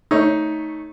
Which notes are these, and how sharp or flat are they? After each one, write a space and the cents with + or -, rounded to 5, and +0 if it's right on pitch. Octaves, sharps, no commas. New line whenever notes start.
A3 +0 D#4 +10 C#5 +0